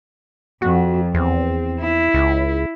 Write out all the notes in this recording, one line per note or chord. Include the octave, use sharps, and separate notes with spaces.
F2 F#4
E2 C4
E4
C#2